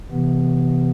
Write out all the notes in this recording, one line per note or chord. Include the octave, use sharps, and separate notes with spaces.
C3 E3 B3